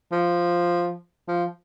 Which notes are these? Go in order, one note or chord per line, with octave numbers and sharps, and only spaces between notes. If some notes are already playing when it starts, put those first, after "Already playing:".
F3
F3